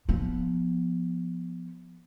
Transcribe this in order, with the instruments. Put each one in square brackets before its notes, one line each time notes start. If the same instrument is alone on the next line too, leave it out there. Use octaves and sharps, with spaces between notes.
[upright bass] F3 B3